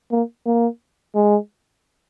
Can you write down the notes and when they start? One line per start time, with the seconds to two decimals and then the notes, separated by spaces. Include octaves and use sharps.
0.11 A#3
0.46 A#3
1.15 G#3